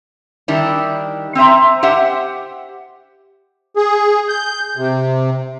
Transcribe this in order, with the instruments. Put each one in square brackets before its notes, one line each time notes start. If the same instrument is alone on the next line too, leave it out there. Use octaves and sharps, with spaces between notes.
[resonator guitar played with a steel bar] D#3 G3 D4 E4
C4 C5 E5 A#5
G4 C5 E5 F#5
[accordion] G#4
G6
C3